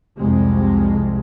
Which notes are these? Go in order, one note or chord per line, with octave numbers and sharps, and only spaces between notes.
C2 F2 C3 G#3